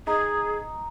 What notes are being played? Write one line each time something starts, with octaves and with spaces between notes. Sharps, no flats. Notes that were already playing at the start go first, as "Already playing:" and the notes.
D#4 G#4